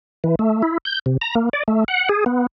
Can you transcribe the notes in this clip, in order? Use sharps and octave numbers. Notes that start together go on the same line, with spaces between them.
E3
A3
E4
G6
C3
A#5
A#3
D5
A3
F#5
G#4
B3